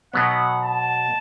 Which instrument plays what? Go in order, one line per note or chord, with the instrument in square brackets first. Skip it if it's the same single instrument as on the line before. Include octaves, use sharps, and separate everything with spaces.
[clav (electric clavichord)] B2 F#3 B3 [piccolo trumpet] F#5
[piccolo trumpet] A5